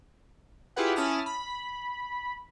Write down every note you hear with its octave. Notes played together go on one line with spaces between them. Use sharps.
E4 F4 G4 G#4 B4 F#5
C#4 E4 A5 D#6 F6
B5